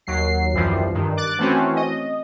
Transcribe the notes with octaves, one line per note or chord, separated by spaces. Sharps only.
D#2 F#3 C7
A#1 F#2 E3 F3 G3
G2 D#3
D6 F#6 A6
E3 A3 C4 C#4 F#4
D#5